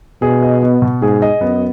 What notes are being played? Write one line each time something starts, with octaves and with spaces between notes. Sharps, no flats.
B2 G#4
D#5
B3
B2
G#2 G#4
D#5
F#2 B3